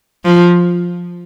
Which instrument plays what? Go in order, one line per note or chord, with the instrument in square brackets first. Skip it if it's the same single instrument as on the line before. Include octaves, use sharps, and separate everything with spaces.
[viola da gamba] F3